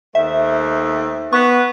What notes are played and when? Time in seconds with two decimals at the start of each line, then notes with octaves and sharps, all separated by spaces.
0.15 D#2 A3 C5 E5
1.33 B3 C#6